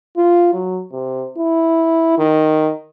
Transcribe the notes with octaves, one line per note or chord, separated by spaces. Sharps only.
F4
F#3
C3
E4
D#3